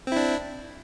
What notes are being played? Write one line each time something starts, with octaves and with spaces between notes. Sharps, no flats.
C4 D4 E4